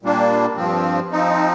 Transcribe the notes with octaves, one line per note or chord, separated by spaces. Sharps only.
A#2 G3 A#3 D4
G2 F3 C4
F3 C4 D#4